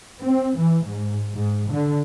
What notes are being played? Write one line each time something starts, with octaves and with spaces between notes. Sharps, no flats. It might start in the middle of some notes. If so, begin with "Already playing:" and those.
C4
E3
G#2
G#2
D3